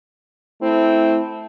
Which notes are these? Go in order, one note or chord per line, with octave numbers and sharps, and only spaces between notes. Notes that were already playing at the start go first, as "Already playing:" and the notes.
A3 C4 E4